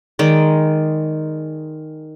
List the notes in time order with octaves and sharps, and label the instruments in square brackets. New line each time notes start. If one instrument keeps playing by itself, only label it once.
[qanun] D#3 G#3 D5